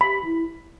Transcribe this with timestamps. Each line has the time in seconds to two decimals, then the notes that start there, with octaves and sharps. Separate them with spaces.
0.01 G4 B5
0.24 E4